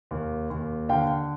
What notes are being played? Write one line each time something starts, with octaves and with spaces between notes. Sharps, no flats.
D#2
D#2
D3 F5 G5